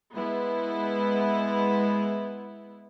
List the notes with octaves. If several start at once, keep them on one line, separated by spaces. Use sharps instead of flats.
G#3 B3 E4